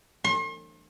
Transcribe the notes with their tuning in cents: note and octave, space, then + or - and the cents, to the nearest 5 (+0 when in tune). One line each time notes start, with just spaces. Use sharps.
C6 +45